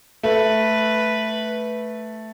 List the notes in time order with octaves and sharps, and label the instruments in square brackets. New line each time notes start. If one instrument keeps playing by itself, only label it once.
[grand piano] A3 [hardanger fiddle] B4